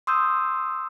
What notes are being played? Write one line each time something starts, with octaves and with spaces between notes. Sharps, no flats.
C6 D#6 E6 G6